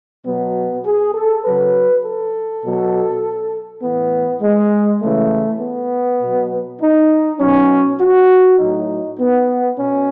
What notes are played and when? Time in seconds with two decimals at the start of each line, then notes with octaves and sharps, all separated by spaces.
0.25 B2 F#3 B3
0.84 G#4
1.14 A4
1.44 C#3 F#3 B4
2.04 A4
2.64 B2 F#3
3.82 A2 E3 B3
4.41 G#3
5.01 C#3 E3 A3
5.61 B3
6.20 B2 F#3
6.81 D#4
7.39 B2 F#3 C#4
8.00 F#4
8.59 A2 F#3 D#4
9.19 B3
9.78 B2 C#4